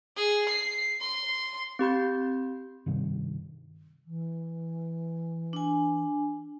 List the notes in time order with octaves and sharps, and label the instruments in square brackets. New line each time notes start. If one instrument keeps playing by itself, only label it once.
[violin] G#4
C7
C6
[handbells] C4 G4 B5 G6
[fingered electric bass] G2 C3 D#3 G3
[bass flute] E3
[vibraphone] D4 G#5